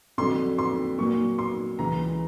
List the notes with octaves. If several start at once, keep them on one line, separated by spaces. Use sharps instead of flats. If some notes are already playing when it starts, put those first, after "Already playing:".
F2 D3 F#3 C6
C6
A#2 F#3 A#3 C#6
C6
C#2 C#3 E3 A#5